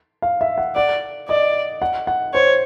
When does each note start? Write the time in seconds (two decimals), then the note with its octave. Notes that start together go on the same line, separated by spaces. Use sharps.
0.22 F5
0.41 E5
0.58 F#5
0.75 D5 F#5
1.29 D5 D#5
1.82 F#5
2.07 F#5
2.33 C5 C#5